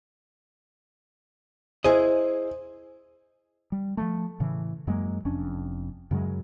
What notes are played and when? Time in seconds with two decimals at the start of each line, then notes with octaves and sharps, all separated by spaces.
1.84 E4 G#4 C5 D#5
3.72 G3
3.97 F3 G3 A3
4.40 A2 C#3 E3
4.87 F#2 F#3 G#3 A#3
5.25 F1 F2 C#4 D4
6.11 F#2 C#3 F#3 G#3